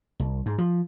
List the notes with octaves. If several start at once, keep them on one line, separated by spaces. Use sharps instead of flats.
C2
G#2
F3